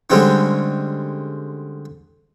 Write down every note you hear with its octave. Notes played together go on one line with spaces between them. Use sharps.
D3 G3 G#3 C4 C#4